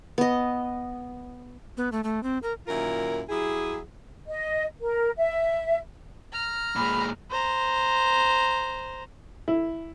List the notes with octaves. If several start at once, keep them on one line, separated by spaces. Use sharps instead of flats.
B3 D#5
B3
A3
A3
C4
A#4
F#2 A#2 D#3 E4 F4 A#4
F#3 E4 G4 G#4
D#5
A#4
E5
A#5 F6
A#2 G#3 B5
C5 A#5
E4